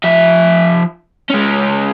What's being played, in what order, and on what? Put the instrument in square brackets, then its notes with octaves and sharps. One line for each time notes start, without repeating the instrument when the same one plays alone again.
[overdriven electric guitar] F3 E5
G#3 C#4